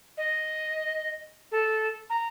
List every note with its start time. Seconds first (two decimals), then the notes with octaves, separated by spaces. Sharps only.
0.17 D#5
1.51 A4
2.10 A#5